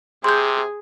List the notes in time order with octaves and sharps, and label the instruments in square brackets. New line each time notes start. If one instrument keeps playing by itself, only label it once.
[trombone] C3 [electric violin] G#4 [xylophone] C6 G6